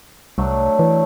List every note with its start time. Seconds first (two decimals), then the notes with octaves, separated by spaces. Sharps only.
0.38 C2 F#3 A3 D4
0.79 E3